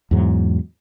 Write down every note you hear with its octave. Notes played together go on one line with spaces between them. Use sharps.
E2 G#2 F#3